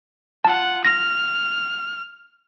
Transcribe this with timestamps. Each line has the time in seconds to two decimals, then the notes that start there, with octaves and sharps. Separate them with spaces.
0.45 F4 F#5 A5
0.85 F6 A#6